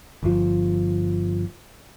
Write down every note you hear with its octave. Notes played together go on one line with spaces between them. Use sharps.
G1 F3